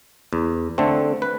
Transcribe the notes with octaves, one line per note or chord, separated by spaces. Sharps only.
E2
D3 A3 C4
B4